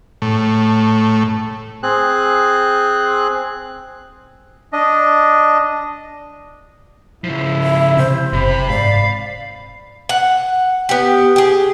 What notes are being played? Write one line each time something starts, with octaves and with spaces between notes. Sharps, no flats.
A2
C4 G#4 F#6
D4 D#5
C#3 F3 E4
E5
C3 C5
F#1 C3 B5
G#2 D5 F5
F#5
B3 G4
G4 G#4